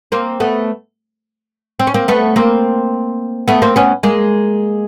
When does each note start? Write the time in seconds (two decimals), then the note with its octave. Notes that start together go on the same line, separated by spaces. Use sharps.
0.12 A#3 C4
0.40 A3 B3
1.79 C4
1.87 C#4
1.94 A#3 C4
2.08 A3 B3
2.36 A#3 C4
3.48 A3 B3
3.62 A#3 C4
3.76 B3 C#4
4.03 G#3 A#3